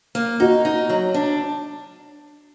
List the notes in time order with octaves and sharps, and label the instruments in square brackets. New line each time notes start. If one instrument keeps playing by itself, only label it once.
[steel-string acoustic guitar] A#3
[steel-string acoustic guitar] D#4 [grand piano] F#4
[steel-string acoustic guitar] D#4
F#3
D4